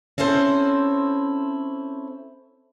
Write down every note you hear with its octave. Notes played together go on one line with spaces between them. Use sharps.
C4 C#4 E4 A4 C5